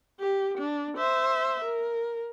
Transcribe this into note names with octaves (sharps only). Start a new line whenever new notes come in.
G4
D4
C5 E5
A#4